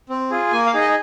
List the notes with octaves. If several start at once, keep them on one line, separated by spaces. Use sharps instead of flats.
C4
F4 G#4
A#3 G#5
F5
D#4 G#4
D#5